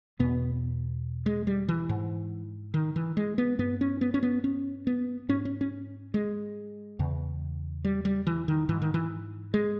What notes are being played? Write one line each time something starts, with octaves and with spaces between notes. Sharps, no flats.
E2 B2 B3
G#3
G3
E3
G#2
D#3
E3
G#3
B3
G2 B3
C#4
B3
C#4
B3
C#4
B3
G#2 C#4
C#4
C#4
G#3
E2 C#3
G3
G3
E3
D#3
G#2 E3
D#3
E3
G#3